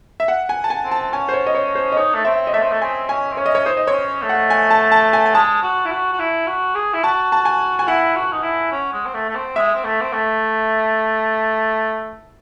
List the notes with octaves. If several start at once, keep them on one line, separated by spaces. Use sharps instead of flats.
E5
F#5
G#5
A5
G#5
C4
A5
C#4 G#5
C5
C#5
D#5
C#5
C5
D#5
D#4 C#5
A3
C4 E5
D#5
A3 E5
C4
A3
C4 G#5
C#4 G#5
C4
C#4 C#5
D#5
C#5
D#4 C5
D#5
C4 C#5
C#4
A3
F#5
G#5
A5
A5
G#5
G#5
G#3 A5
F#4
E4
F#4
F#4
E4
F#4
G#4
E4
F#4 A5
A5
G#5
G#5
E4 F#5
F#4
D#4
E4
C#4
G#3
C4
A3
A3
C4
G#3 E5
C4
A3
C4
A3